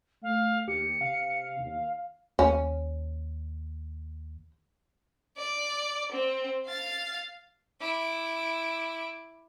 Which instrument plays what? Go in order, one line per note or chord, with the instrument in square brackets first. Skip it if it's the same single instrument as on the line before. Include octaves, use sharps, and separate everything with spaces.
[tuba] A3 [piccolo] F5
[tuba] D#2 [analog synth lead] G4 [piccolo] C#7
[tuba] C3 [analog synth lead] F5
[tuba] D#2
[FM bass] D#2 [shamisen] C#4
[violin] D5
C4
F5 A6
[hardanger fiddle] E4 D6